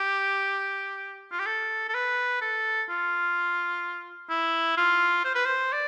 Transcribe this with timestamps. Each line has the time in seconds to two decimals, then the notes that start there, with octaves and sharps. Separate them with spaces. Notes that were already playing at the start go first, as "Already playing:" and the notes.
Already playing: G4
1.32 F4
1.40 G4
1.46 A4
1.89 A4
1.94 B4
2.41 A4
2.89 F4
4.30 E4
4.77 F4
5.25 C5
5.35 B4
5.46 C5
5.73 D5